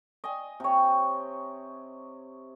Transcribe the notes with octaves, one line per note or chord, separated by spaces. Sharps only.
D#5 G#5
C3 C#5